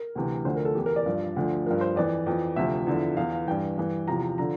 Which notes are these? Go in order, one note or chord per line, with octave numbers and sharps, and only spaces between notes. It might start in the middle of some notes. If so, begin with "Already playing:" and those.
Already playing: A#4
D2 C3 E3
D2 D3 F3 C5
A#4
A4
E2 E3 G4
A#4
D5
G2 F3
D2 D3 F3
G2 F3 A#4
C5
F2 E3 D5
F2 E3
D2 C3 F3 E5
E2 D3 F3
E2 E3 F5
F5
G2 E3 G5
G2 E3
E2 C3 F3 A#5
D3 F3 A#5